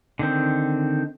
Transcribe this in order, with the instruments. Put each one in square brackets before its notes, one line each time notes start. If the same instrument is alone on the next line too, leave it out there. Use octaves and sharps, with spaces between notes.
[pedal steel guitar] D3 D#3 C4